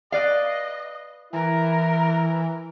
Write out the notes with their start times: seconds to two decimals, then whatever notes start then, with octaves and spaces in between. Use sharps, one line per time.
0.12 B4 D5 D#5 F5
1.33 E3 E4 A#4